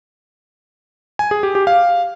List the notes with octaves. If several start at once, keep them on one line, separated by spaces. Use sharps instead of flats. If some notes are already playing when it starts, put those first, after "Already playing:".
G#5
G#4
G4
G4
F5